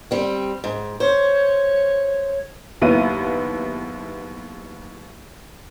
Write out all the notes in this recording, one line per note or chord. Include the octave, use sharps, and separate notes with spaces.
G3 C4
G#2
C5 C#5
F#1 D#2 B3 E4 D#7